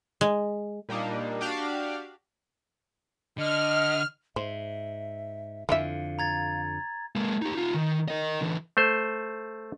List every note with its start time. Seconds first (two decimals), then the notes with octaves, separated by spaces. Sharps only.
0.21 G#3
0.89 A#2 G3 A#3 D4 D#4
1.41 D4 F#4 G4 D5 F5
3.38 D3 D#5 F6
4.36 G#2 C5 E5
5.69 F2 D3 E3 F4 E5 F5
6.19 A#5 G#6 A6
7.16 G#3 A#3
7.42 D#4 G4
7.55 D#4 F4
7.74 D#3
8.08 A#4 D#5
8.41 D3 E3
8.77 A3 C5